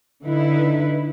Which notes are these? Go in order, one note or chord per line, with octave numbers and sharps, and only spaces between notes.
D3 D#4 E4 B4